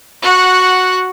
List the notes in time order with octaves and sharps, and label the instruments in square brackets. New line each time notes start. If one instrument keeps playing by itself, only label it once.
[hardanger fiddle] F#4 F#5